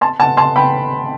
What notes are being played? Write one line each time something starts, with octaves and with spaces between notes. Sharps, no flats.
A5 C6
F#5 A5
A5 C6
G5 B5